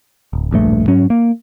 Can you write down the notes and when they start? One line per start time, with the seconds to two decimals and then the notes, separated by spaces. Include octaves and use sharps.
0.33 D1
0.51 D1 A#1 G2 A3
0.88 G#2 F#3 C#4
1.10 A#3